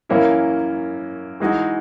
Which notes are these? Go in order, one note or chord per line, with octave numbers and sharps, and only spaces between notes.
F#2 E3 A#3 C#4 E4
E3 G#3 D#4 F#4